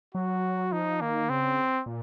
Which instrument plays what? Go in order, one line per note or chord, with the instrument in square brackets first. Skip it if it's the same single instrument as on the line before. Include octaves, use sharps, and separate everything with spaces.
[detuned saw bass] F#3 [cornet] F#4
[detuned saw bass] F3 [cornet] D#4
[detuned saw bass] D#3 [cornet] A#3
[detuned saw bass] C#3 [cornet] C4
[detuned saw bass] A#2